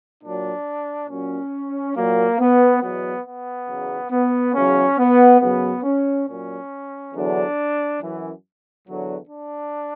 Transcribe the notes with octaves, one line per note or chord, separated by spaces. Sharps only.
A#2 F#3 D4
A#2 F#3 C#4
A#2 F#3 A#3
B3
E2 B2 F#3 B3
B3
E2 C#3 F#3
B3
E2 C#3 F#3 C#4
B3
F#2 C#3 F#3 B3
C#4
A#2 F#3 C#4
E2 D3 F#3 D4
F#2 E3
E2 D3 F#3
D4